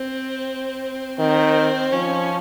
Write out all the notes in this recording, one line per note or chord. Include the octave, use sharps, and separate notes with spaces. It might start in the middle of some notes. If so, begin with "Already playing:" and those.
Already playing: C4
D#3 C4
F3 C#4